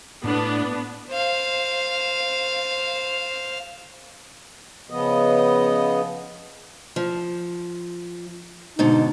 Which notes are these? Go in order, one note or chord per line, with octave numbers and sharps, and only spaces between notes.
A2 B3 D4
C5 F5
C#3 F3 B3 D#5
F3
G#2 B2 D3 D#4